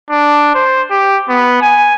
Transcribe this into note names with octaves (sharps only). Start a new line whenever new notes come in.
D4
C5
G4
B3
G#5